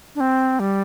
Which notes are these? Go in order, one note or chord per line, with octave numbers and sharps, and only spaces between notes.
D4
C4
G3